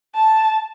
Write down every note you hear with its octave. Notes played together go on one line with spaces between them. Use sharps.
A5